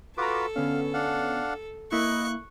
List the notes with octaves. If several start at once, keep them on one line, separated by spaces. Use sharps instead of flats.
F4 F#4 A4 B4 A#5 D6
D3 B3 C#4 F5
D4 F5 F#5
A#3 E4 D#5 C#6 F#6